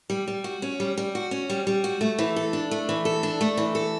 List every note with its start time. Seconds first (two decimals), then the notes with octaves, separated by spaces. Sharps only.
0.10 G3
0.28 G3
0.44 F#4
0.62 C#4
0.80 G3
0.98 G3
1.15 F#4
1.31 C#4
1.50 G3
1.67 G3
1.84 F#4
2.01 A3
2.19 E3
2.36 A4
2.53 D4
2.71 A3
2.89 E3
3.05 A4
3.23 D4
3.41 A3
3.57 E3
3.75 A4